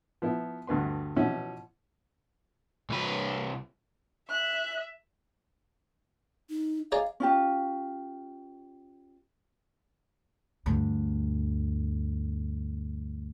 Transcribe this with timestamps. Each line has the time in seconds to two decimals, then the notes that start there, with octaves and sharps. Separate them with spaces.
0.22 F3 B3 E4
0.67 D2 G2 B4 C6
1.16 B2 E3 F3 C#4 E5 F#5
2.90 C2 B4
4.30 E5 F#6
6.50 D#4
6.92 D#4 G#4 D5 F5
7.20 C#4 F4 G4
10.66 D2 G2